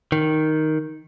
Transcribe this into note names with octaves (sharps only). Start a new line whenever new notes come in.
D#3